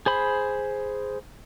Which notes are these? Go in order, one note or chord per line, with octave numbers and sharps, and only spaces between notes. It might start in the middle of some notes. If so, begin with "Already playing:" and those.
G#4 C5 B5